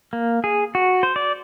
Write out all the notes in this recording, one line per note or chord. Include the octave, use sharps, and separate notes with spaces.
A#3
G#4
F#4
C5
D5